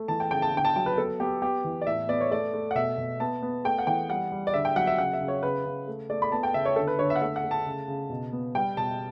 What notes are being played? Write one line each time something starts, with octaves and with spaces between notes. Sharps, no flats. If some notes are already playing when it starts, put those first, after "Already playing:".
Already playing: A3
E3 A5
G5
C#3 G5
A5
D3 G5
A5
F#3 G5
B4
B3 A4
B3 G4
B3 G4
E3
D5
A2 E5
B3 D5
C#5
A3 D5
A3
F#5
B2 E5
B2
B3 A5
B3
A3 G5
F#5
E3 G5
G3 F#5
G3
D5
D3 E5
G5
F#3 F#5
E5
C#3 F#5
E5
C#3
C#5
C#3 B4
C#3
A3
A3 D5
B5
B3 A5
G5
C#3 E5
C#5
D3 A4
B4
D3 C#5
E5
F#5
A3 E5
F#5
A3
A5
C#3
C#3
B2
B3
G3 G5
B2 A5